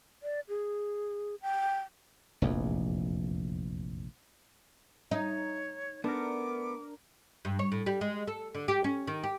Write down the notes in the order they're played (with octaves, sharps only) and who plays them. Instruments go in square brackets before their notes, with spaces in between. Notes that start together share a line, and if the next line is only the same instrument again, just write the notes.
[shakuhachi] D5
G#4
G5
[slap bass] F1 A#1 E2
[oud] D#4 [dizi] C#5
[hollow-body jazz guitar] A3 B3 [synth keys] D4 A#4 [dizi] D6
[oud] G2
C#5
A2
G3
G#3
A4
D3
G4
C#4
D#3
G4